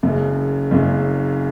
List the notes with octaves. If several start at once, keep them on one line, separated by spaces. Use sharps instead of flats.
F#1 F#2 C#3
F#1 F#2 C#3